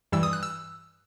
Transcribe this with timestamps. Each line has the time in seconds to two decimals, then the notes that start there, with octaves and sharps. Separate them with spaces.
0.12 G2 E3 G3 E6
0.23 D#6
0.33 F#6
0.43 E6